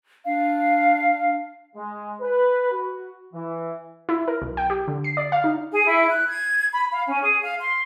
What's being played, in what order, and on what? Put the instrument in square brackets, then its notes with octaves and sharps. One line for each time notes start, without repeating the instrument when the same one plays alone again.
[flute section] D4 F5
[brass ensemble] G#3
B4
F#4
E3
[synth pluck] E4
A#4
B1
G5
G4
D3
C7
D5
F5
D#4
[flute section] G#4
E4
F#6
G#6
B5
F5
C#4
G#4
F5
C6